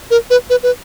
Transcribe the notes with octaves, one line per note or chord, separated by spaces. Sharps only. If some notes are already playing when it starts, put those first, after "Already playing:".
A#4
B4
B4
B4